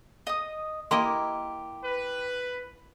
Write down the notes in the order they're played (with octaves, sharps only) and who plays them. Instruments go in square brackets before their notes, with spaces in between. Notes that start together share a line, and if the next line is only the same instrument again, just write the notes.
[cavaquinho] D#5 D#6
[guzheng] A#3 E4 D#5 [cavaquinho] G4 [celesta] C6
[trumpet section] B4